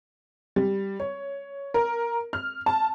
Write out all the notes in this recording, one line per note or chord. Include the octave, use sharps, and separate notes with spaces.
G3
C#5
A#4
F6
A5